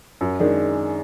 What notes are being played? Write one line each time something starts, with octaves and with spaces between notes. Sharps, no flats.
F#2
D#3 G#3 D4 G#4